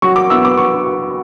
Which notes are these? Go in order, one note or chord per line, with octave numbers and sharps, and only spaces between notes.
F#3 C#6
D6
B3 E4 E6
D6
F#3 C#6